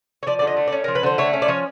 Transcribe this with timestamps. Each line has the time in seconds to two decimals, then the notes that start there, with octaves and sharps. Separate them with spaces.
0.23 C#5
0.27 F3 D5
0.39 D5
0.42 D3
0.47 D#5
0.57 A3
0.67 D5
0.72 C#4
0.84 F3 A#4
0.95 B4
1.03 D3 C5
1.18 A3 C#5
1.33 C#4
1.42 D5
1.48 F3 C#5